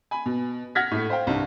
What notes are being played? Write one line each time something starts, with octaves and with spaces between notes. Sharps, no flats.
G#5 B5
B2
F#5 F6 G#6 A#6 B6
A2 A3
C5 F5 G5
C2 G2